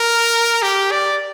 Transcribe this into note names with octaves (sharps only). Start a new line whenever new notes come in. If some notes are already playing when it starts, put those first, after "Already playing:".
Already playing: A#4
G4
D5